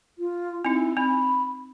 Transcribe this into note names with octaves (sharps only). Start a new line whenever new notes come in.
F4
C4 D#4 E4
C4 B5